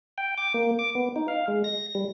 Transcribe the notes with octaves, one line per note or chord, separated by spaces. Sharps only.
G5
D6
A#3
D6
B3
D#4
F5
G#3
A#6
G3